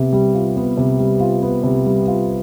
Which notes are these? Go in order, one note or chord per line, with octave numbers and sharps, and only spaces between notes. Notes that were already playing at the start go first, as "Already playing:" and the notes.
Already playing: C3 B3
G3
F4
B3
C3
G3
F4
B3
C3
G3
F4